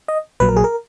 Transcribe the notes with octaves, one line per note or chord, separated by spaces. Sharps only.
D#5
A#1 A#2 F#3 B4
A#4
G#4
A#4